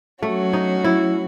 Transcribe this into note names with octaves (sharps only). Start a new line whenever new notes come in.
F#3 A3 C#4 F#4
D#4
E4